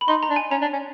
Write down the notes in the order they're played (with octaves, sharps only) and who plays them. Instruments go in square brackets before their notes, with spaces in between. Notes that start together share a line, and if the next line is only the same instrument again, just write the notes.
[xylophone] B5
[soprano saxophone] D#4 [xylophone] C6
[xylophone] A#5
[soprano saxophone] D4
[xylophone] G#5
[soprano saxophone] C#4 [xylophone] A#5
[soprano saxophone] D4
C#4